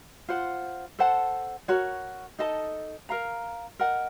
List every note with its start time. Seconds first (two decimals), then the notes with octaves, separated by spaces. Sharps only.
0.28 F4 C5 F#5
0.99 A4 C5 F#5 A5
1.68 F#4 A#4 C#5
2.39 D#4 A4 D#5 A5
3.09 A#4 F5 A#5
3.79 A#4 D#5 F#5